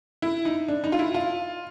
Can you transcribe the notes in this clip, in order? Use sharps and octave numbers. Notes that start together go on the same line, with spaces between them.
E4
D#4
D4
D#4
F4
E4
F4